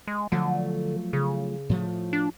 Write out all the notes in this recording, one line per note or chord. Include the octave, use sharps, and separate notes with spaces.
G#3
D3 F3 F#3 A3
C#3
A2 F3 A3
D4